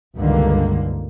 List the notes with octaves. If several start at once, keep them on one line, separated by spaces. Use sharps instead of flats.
C#2 G2 D3 D#3 A#3